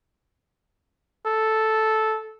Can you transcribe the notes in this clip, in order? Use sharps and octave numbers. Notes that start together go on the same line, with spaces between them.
A4